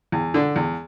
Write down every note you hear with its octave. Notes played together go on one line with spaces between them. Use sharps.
E2
D3
E2